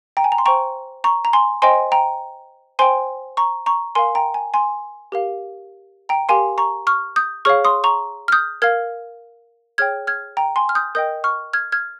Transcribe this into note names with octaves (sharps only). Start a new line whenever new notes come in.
G5 A#5
G#5
A#5
C6
C5 G5 A#5 C#6
A#5 C#6
A#5
G#5 C6
C5 D#5 G5 G#5 C6
G5 A#5
C5 G5 G#5 C6
A#5 C#6
A#5 C#6
A#4 F5 G#5 C6
G5 A#5
G#5
G#5 C6
G4 A#4 F5
G5 A#5
G4 A#4 F5 G#5 C6
A#5 C#6
C#6 F6
D#6 G6
G#4 C#5 F5 C#6 F6
C6 D#6
A#5 C#6
F6
D#6 G6
A#4 F5 F6 G#6
G#4 C#5 G5 F6 G#6
F6 G#6
G5 A#5
G#5 C6
F6
D#6 G6
A#4 D#5 G5 D#6 G6
C#6 F6
F6 G#6
F6 G#6